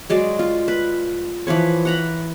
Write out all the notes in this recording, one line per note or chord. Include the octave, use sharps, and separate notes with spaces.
F#3 G#3 D5
F4
B4
E3 F3 B4 C#5
F#5 A#5 B5